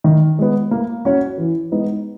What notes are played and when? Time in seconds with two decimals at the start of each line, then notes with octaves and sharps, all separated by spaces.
0.04 D#3
0.39 G#3 B3
0.71 A#3
1.05 C#4 F#4 C#5
1.38 E3
1.72 G#3 B3 D#4